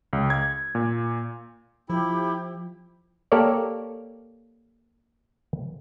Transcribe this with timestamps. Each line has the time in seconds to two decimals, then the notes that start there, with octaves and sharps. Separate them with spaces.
0.13 C#2
0.30 G#6
0.75 A#2
1.90 F3 E4 G4
3.32 A#3 G4 A4 A#4 C#5 D5